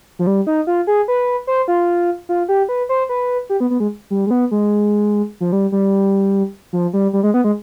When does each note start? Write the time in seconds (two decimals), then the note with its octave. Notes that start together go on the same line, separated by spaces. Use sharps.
0.19 F3
0.27 G3
0.47 D#4
0.67 F4
0.87 G#4
1.08 B4
1.47 C5
1.68 F4
2.29 F4
2.49 G4
2.69 B4
2.89 C5
3.09 B4
3.50 G4
3.60 B3
3.70 B3
3.80 G#3
4.10 G3
4.27 G#3
4.31 B3
4.51 G#3
5.41 F3
5.52 G3
5.72 G3
6.73 F3
6.93 G3
7.13 G3
7.23 G#3
7.34 B3
7.44 G#3